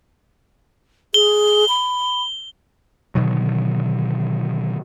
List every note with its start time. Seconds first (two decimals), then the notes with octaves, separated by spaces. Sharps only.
1.14 G#4 G7
1.69 B5
3.15 B2 D3 D#3 F#3